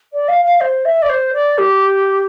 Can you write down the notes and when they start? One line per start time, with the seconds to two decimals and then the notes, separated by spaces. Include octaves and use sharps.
0.12 D5
0.28 F5
0.44 F5
0.60 C5
0.85 E5
1.02 D5
1.09 C5
1.33 D5
1.57 G4